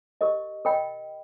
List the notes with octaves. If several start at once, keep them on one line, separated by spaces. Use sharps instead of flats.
G4 A#4 D#5
A#4 D#5 G5 B5